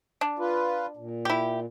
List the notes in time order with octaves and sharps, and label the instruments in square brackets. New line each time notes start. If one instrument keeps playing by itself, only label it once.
[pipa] D4
[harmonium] F4 B4
A#2
[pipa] E4 G4